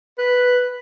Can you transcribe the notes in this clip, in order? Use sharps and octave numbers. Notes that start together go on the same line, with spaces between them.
B4